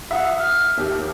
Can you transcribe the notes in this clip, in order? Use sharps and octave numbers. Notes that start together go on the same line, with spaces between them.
E5 F#5 D#6
F6
D#2 G4